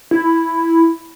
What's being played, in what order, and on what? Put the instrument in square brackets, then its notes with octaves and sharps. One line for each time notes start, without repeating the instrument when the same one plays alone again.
[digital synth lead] E4